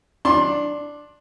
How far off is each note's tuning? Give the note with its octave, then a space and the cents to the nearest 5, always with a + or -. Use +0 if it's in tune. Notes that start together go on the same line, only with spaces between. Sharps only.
D4 +0 D5 +0 C6 +25